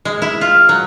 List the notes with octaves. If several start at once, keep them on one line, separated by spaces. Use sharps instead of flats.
G#3
E4
F4
F#3